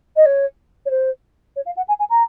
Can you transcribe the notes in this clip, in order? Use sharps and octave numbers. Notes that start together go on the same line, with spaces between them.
D#5
C#5
C#5
C5
C#5
F5
F#5
G#5
G#5
A#5